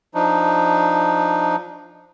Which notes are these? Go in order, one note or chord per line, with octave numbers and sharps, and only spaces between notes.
F3 D4 D#4